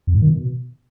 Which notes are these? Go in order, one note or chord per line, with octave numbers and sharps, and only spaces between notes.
F2
G#2
D#3
B2